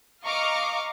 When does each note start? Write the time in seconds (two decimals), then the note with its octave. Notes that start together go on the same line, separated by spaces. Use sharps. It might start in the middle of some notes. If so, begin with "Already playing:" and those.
0.23 D#5 F5 A#5 C#6 D6 F6